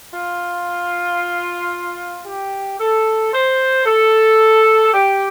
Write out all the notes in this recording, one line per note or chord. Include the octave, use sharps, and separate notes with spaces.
F4
G4
A4
C5
A4
G4